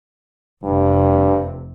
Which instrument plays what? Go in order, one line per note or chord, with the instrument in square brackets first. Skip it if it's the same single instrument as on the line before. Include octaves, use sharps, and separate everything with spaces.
[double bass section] F1 C3 [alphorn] G2